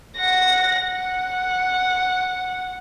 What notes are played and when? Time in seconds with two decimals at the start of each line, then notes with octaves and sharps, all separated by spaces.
0.18 F#5 A#6
0.85 F#5